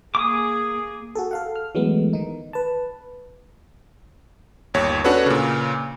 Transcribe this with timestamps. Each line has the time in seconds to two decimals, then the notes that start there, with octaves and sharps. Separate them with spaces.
0.15 A#3 G#4 D6 D#6
1.15 F#4 G#4 A4
1.31 A4 F5 F#5
1.56 F6
1.75 E3 F#3 G#3 A3 B3
2.13 D#3 D#4
2.53 B4 A5
4.74 G1 D#2 C#5
5.04 C#4 D4 F#4 A4 B4 C#5
5.26 A#2 C#3